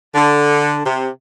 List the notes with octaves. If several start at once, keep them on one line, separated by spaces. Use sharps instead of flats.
D3
C3